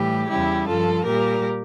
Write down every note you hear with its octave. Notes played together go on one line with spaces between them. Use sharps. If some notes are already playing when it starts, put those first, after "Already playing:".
Already playing: A2 E3 G3 G4
E2 C#3 G3 E4 G4
G2 F3 F4 A4
A#2 G3 G4 A#4